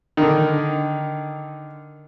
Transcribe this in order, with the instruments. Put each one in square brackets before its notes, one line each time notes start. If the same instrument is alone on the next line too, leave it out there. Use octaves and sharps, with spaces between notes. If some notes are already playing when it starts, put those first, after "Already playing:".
[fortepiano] D3 D#3